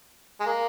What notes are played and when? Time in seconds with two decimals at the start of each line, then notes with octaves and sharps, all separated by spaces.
0.41 G#3
0.46 A#3